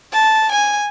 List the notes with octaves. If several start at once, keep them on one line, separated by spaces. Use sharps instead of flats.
A5
G#5